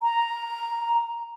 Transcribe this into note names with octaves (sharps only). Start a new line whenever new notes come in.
A#5